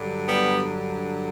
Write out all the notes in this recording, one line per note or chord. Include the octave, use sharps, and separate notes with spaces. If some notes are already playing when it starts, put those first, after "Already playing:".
Already playing: G2 D3 F#3
G3 B3